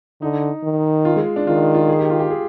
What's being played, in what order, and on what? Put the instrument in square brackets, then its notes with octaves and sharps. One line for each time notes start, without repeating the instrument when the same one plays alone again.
[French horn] D3 [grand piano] D#4
[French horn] D#3
[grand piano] F4
G#3
D4
[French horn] D#3 [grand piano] F4
[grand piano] F4
G#4
G4
F4
G4
G#4